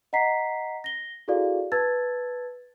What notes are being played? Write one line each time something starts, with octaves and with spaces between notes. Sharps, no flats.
D#5 F#5 A#5 B6 C7
A#6 G7
E4 F#4 G#4 A4 D5 F5
B4 A5 E6 G#6 A6